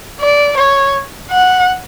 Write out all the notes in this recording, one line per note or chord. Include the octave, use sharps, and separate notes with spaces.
D5
C#5
F#5